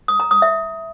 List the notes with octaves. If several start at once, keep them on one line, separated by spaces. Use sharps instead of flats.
D#6
A#5
D#6
E5